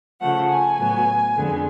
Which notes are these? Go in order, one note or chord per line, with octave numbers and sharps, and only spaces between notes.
C#3 F3 A3 F#5
G#5
A2 F#3 B3
F2 D3 G#3 B3